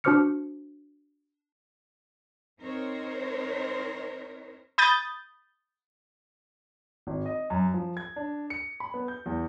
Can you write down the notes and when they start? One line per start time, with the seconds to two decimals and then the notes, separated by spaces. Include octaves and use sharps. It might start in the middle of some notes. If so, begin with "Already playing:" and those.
0.04 D4 F#4 C5 D6 F6 C#7
2.61 C4 D#4 A#4 C5 C#5
4.78 B5 D#6 G6 A6
7.07 G#1
7.26 D#5
7.50 F#2
7.74 F3
7.97 G#6
8.16 D4
8.50 C#7
8.80 B5
8.94 B3
9.08 G6
9.26 E2